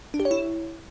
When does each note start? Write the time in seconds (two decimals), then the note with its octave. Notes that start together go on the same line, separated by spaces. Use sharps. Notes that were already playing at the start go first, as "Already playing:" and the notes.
0.14 D4
0.20 G4
0.25 C#5
0.31 E4